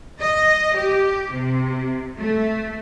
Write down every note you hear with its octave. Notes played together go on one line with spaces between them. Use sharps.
D#5
G4
C3
A3